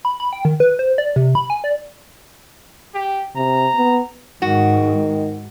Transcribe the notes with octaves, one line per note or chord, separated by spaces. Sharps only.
B5
B5
G5
D#3
B4
C5
D5
C3
B5
G#5
D5
G4
C3 A#5
B3
G#2 D#3 F#4